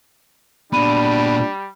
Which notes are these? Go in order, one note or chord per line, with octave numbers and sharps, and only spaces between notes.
A#2 G3 B3 D4 B5 D#7